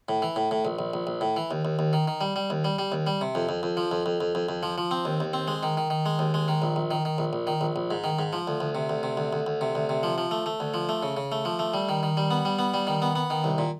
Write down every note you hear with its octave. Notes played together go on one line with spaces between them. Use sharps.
A2
E3
A2
A2
A#1
A#1
A#1
A#1
A2
E3
D#2
D#2
D#2
D#3
D#3
G3
G3
D#2
G3
G3
D#2
G3
C3
F2
F2
F2
F3
F2
F2
F2
F2
F2
F3
F3
C4
D#2
D#2
C4
G#3
D#3
D#3
D#3
G#3
D#2
G#3
D#3
A#1
A#1
D#3
D#3
A#1
A#1
D#3
A#1
A#1
G#2
D#3
G#2
F3
D2
D2
C3
D2
C3
D2
D2
D2
C3
D2
C3
F3
F3
A3
A3
D2
F3
A3
C#3
C#3
A3
F3
A3
G3
D#3
D#3
G3
B3
G3
B3
G3
D#3
B3
B3
D#3
C2
A#2